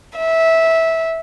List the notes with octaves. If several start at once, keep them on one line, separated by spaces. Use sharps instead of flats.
E5